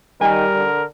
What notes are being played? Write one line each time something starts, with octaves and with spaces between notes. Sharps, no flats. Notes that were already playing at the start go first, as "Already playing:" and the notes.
D#3 G3 A#4 G#5
D3